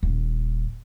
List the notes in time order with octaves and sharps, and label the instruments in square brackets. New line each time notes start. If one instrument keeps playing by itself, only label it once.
[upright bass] D#1